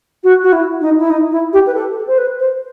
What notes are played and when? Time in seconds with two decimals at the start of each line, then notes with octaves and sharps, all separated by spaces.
0.24 F#4
0.43 F#4
0.52 E4
0.81 D#4
0.99 E4
1.10 D#4
1.31 E4
1.53 G4
1.66 B4
1.74 A4
1.96 A4
2.07 C5
2.18 B4
2.39 C5